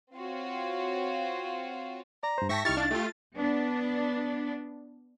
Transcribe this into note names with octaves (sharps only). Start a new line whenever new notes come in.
C4 F4 F#4 C#5 F5
D5 A#5
G2 C5
G#2 E5 G5 A5 C#6 A#6 B6
C2 D#4 E4 G4 C#6 F6 A6
D4 F5
A3 F4 G4
B3 D4